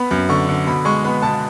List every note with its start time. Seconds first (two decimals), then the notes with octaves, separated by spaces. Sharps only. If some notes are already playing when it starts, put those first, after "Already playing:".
Already playing: B3 B5
0.11 F#2
0.29 D3 C#6
0.49 D3
0.67 B2 B5
0.85 G#3 C#6
1.04 B3 B5
1.22 B2 A5